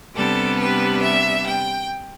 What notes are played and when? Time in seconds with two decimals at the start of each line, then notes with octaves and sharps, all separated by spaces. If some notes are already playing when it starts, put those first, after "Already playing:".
0.14 C3 G3 B3 D4 A4
0.59 B4
1.02 E5
1.46 G5